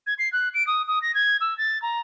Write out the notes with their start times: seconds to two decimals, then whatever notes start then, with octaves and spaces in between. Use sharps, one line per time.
0.07 G#6
0.19 C7
0.33 F#6
0.54 D7
0.67 D#6
0.88 D#6
1.02 A#6
1.15 G#6
1.41 E6
1.58 A6
1.82 A#5